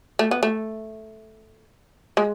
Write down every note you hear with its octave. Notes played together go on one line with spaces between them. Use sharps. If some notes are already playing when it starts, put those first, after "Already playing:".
A3
B3
A3
G#3